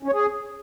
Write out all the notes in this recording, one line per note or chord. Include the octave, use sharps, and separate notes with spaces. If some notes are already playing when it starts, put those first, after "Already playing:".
C#4
C#5
G#4